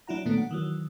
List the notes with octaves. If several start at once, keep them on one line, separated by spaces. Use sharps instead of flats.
F#3 D4 E4 F4 F#5 A#5
A#2 D#3 F#3 A3 B3 D4
F#5
D#3 E3 F#3